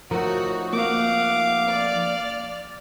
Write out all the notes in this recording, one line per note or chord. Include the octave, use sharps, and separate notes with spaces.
F3 A3 D#4 F#4 A#4 C#5
A#3 F5 F#5 D6
D5 F6